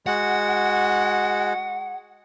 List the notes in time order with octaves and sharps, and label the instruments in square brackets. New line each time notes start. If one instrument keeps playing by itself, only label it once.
[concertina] G#3 F#4 [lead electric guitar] F#5